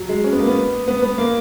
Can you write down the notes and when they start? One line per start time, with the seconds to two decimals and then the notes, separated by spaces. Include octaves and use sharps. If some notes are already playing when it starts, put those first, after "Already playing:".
Already playing: F#3
0.09 G#3
0.24 C#4
0.32 B3
0.39 A#3
0.48 B3
0.88 B3
1.02 B3
1.18 A#3